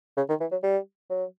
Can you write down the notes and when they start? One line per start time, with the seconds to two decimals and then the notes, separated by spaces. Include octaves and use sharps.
0.17 C#3
0.29 D#3
0.41 E3
0.51 F#3
0.63 G3
1.10 F#3